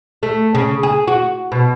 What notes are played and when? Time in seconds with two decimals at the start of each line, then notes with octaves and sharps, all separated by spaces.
0.23 A3
0.55 C#3
0.83 G#4
1.07 F#4
1.52 B2